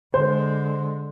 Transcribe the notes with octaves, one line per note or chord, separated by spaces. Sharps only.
D3 G#3 C5